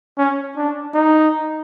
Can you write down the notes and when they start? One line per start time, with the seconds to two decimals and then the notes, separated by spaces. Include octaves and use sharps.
0.18 C#4
0.57 D4
0.94 D#4